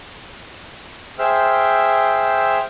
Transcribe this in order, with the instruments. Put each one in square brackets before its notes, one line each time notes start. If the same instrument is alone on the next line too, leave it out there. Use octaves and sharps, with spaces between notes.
[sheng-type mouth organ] G#4 C5 E5 G5 E6 F6